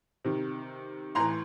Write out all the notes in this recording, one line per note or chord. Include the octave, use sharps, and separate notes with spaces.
C3 D#3
A2 E3 A#5 C6